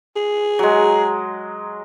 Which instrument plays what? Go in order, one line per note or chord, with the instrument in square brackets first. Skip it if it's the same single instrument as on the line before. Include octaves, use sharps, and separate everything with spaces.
[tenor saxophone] G#4
[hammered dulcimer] F#3 G#3